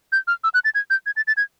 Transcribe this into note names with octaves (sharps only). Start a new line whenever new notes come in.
G6
F6
E6
F#6
A6
G#6
G6
G#6
A6
A6
G#6